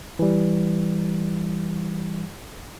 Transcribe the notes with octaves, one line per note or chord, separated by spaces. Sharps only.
E3 G3